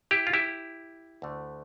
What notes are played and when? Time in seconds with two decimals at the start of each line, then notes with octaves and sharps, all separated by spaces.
0.11 E4 G4
0.27 F4
0.33 E4 G4
1.22 D2 D3 A3